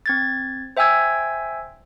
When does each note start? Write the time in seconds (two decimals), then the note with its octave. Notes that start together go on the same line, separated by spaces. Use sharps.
0.06 C4 G#6 A6
0.77 C5 E5 G5 G#5 E6 G#6